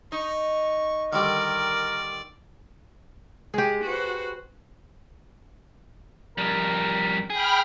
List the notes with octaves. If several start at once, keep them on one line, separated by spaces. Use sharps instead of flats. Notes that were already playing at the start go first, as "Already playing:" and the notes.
D#4 C#6
D3 D#3 G3 A#4 D5
G#3 G4 G#4
F#4 B4 C5
F2 G3 A#4
G#4 G5 B5 F6